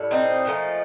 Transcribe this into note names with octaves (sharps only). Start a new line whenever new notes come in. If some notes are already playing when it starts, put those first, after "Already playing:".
Already playing: A2 G3
C4 D#4
A#2 F3 A3